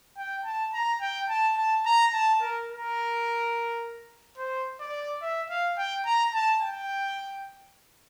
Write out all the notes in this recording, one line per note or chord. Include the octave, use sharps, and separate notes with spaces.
G5
A5
A#5
G5
A5
A5
A#5
A5
A#4
A#4
C5
D5
E5
F5
G5
A#5
A5
G5